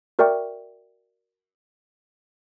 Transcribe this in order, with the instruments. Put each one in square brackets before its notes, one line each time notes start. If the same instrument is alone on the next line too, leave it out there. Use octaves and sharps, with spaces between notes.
[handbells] F#4 A#4 D5 E5 G5 C#6